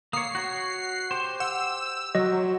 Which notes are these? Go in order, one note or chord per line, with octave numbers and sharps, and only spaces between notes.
A#3 C#5 D#6 C7 C#7
F#4 C#5
G4 C5
F#5 E6
F#3 D#5